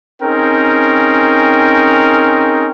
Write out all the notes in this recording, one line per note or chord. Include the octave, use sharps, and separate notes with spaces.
C4 C#4 D#4 G#4 A#4 G5